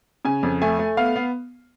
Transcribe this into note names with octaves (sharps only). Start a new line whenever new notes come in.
C#3 G#5
F2
A3 G#5
A3
B3 F5
B3